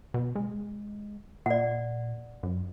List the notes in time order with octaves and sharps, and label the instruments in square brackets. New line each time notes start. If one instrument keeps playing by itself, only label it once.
[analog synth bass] B2
G#3
[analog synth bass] A#2 [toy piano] D5 F#5
[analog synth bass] F#2